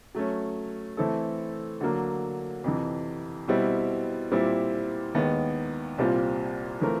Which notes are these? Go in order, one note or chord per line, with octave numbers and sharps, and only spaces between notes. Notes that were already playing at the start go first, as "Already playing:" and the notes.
F#3 A3 C#4
E3 A3 C4 E4 A4
D3 F#3 A#3
F2 C3 E3
B2 G3 C4 E4
A#2 G3 C4 E4
D#2 D#3 G#3 B3
C2 A#2 G3 C4 F4
E3 A3 C4 F4 A#4